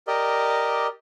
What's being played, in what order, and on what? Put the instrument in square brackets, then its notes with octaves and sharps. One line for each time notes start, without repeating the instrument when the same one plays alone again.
[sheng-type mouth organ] G4 A#4 D5 D#5